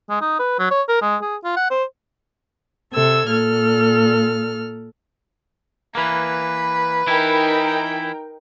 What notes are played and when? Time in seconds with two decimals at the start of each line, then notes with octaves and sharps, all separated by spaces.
0.10 G#3
0.21 D#4
0.39 B4
0.59 F#3
0.71 C#5
0.89 A#4
1.02 G#3
1.22 G#4
1.44 F4
1.57 F#5
1.71 C5
2.94 C3 A4 E6 G#6
3.30 A#2 A4 F6
5.95 E3 A#3 B4
7.07 E3 D#4 E4 A#4 G5